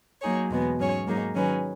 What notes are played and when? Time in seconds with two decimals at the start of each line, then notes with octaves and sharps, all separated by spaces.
0.21 F#3 A#3 D#4 G#4 C#5
0.51 E2 B2 G#3 B3
0.79 G#2 F#3 C#4 G#4 C#5
1.07 G#2 F#3 A#3 D#4 G#4
1.35 D#3 F#3 C#4 G#4 B4